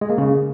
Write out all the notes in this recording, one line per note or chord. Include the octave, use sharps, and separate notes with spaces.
G#3
A#3
C#3